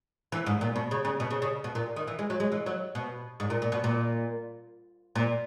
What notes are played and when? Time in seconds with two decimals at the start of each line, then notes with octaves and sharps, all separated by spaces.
0.32 E3
0.46 G#2
0.61 A#2
0.76 B2
0.91 C#3
1.05 C#3
1.20 B2
1.31 C#3
1.42 C#3
1.64 B2
1.75 A#2
1.96 D#3
2.07 E3
2.19 G#3
2.30 F#3
2.40 G#3
2.52 E3
2.66 F#3
2.95 B2
3.40 G#2
3.50 A#2
3.62 A#2
3.72 B2
3.84 A#2
5.16 A#2